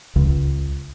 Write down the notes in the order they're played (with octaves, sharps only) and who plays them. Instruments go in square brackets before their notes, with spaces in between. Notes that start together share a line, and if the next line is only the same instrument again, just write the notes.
[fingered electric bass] C#2